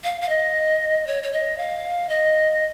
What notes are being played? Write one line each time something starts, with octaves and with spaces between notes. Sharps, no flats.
F5
F5
D#5
C#5
C#5
D#5
F5
D#5